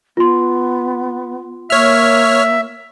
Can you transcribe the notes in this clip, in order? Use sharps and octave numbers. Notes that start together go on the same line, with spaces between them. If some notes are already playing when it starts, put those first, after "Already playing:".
B3 F4 C6
A#3 C#5 E5 F6